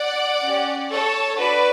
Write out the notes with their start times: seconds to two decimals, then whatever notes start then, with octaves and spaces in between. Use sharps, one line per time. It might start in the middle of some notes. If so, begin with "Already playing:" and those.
Already playing: D5 F#5
0.44 C#4 G4
0.90 A4 C#5
1.38 D4 F#4 A4 B4 D5